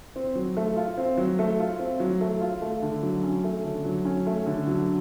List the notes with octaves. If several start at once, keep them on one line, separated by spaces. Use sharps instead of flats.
C4
F#3
A3
F4
C4
F#3
A3
F4
C4
F#3
A3
F4
A3
D3
F#3
C#4
A3
D3
F#3
C#4
A3
D3
F#3